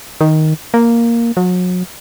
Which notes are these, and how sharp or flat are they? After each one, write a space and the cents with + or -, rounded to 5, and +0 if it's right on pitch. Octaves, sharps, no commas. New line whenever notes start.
D#3 +5
A#3 +0
F#3 -35